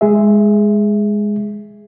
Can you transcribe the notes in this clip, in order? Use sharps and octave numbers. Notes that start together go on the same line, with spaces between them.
G#3 G#4 E5